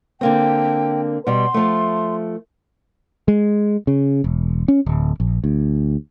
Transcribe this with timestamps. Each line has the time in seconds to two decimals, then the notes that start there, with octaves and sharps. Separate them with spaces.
0.21 D3 A#3 C4 G5
1.27 B2 G3 C6
1.54 F3 A3
3.28 G#3
3.87 C#3
4.24 E1
4.68 C#4
4.86 D1
5.20 A#1
5.44 D2